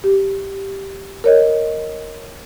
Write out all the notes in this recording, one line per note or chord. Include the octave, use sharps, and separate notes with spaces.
G4
A#4 C#5 D#5